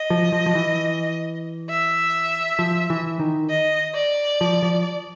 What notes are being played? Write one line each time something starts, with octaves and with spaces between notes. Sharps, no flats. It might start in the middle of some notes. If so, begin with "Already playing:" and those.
Already playing: D#5
F3
F3
F3
E3
E5
F3
E3
D#3
D#5
D5
F3
F3